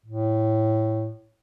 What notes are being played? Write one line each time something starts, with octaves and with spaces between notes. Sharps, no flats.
A2